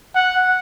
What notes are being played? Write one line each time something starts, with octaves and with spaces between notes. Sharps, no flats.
F#5